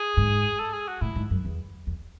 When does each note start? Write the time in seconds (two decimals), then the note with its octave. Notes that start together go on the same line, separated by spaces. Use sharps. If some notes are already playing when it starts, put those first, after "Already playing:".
Already playing: G#4
0.17 G#2
0.59 A4
0.73 G#4
0.88 F#4
1.01 A2 E4
1.16 G#2
1.30 F#2
1.45 E2
1.87 E2